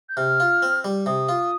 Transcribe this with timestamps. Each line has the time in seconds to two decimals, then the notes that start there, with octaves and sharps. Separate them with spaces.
0.09 G6
0.17 C3 F6
0.40 F4
0.62 C4
0.85 G3
1.06 C3 D#6
1.29 F4